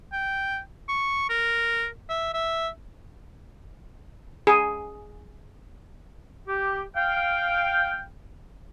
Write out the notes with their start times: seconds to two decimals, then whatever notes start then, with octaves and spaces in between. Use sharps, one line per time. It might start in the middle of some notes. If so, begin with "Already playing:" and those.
0.12 G5
0.88 C#6
1.29 A#4
2.09 E5
2.34 E5
4.47 G#4
6.48 G4
6.96 F5 G5